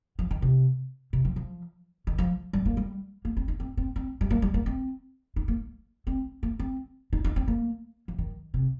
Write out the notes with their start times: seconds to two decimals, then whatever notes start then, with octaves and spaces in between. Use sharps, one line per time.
0.19 F3
0.31 D#3
0.42 C3
1.13 C3
1.25 F3
1.36 F3
2.07 D#3
2.18 F3
2.53 G3
2.65 A#3
2.77 G3
3.25 A#3
3.37 C4
3.48 D#4
3.60 C4
3.77 C4
3.96 C4
4.21 G3
4.31 A#3
4.42 G3
4.54 A#3
4.66 C4
5.36 D#4
5.48 A#3
6.07 C4
6.43 A#3
6.59 C4
7.13 D#4
7.24 D#4
7.36 C4
7.48 A#3
8.08 F3
8.18 D#3
8.54 C3